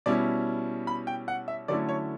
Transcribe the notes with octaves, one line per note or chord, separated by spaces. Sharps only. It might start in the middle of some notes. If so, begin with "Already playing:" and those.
B2 G3 C#4 E4 D5
B5
G5
F#5
E5
D3 F#3 A3 C#4 E4 D5
C#5